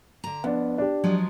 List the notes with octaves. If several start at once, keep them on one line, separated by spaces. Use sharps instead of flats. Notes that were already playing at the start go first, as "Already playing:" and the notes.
D3 A#5
F2 B3 D4
D4 G4
F3 F#3 G#3